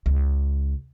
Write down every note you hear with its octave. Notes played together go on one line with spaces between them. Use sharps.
C#2